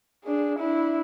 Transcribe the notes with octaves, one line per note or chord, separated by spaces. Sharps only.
D4 G#4
D4 E4